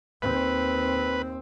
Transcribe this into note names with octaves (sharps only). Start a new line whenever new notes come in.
D#2 C4 B4